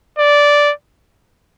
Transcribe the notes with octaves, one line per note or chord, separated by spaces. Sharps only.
D5